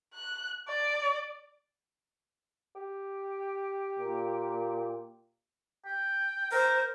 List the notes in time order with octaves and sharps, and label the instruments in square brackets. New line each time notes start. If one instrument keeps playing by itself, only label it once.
[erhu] F#6
D5
[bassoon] G4
[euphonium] A#2
[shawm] G5
[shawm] A#4 [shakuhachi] C5